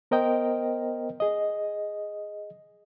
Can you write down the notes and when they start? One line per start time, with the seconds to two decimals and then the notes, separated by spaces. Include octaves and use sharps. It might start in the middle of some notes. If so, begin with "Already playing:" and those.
0.11 B3 A#4 C5 D#5 G5
1.20 G#4 D#5